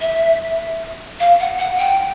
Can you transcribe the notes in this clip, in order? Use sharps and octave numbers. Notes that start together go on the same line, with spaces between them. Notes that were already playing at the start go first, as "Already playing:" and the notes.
E5
F5
F#5
F#5
G5